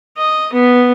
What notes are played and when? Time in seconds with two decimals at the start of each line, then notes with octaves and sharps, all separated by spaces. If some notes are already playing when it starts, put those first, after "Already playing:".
0.18 D#5
0.53 B3